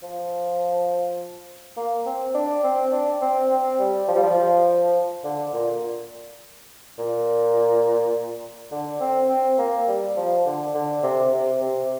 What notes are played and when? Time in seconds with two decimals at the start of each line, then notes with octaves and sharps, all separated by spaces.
0.03 F3
1.77 A#3
2.06 C4
2.34 D4
2.64 C4
2.92 D4
3.21 C4
3.51 C4
3.79 G3
4.08 F3
4.16 G3
4.23 F3
5.24 D3
5.53 A#2
6.98 A#2
8.72 D3
9.00 C4
9.29 C4
9.58 A#3
9.88 G3
10.16 F3
10.46 D3
10.75 D3
11.03 C3
11.33 C3
11.61 C3